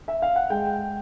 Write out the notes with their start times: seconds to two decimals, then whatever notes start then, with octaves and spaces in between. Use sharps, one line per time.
0.08 E5
0.22 F5
0.36 F#5
0.50 G#3 G5